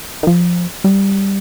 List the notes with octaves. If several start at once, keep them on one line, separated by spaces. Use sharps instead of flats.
D#3
F3
G3